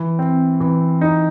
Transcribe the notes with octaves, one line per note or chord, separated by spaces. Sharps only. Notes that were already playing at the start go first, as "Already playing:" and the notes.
Already playing: E3
C4
E3
D#4